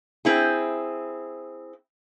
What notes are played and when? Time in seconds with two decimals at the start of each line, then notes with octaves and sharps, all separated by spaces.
0.25 C4 E4 G#4